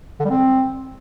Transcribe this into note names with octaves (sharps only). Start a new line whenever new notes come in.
D3
G3
C4